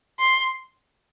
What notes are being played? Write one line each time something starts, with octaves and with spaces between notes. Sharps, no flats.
C6